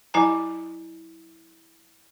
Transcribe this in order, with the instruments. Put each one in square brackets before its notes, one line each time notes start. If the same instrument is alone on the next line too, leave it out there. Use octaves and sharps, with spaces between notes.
[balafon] F#3 E4 D#5 G#5 A#5